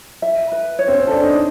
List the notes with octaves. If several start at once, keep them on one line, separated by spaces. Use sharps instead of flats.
E5
B4
C#5
C4
C#4
D4 A4
D#4